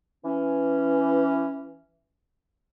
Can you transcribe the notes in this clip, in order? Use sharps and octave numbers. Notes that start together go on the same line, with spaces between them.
E3 C#4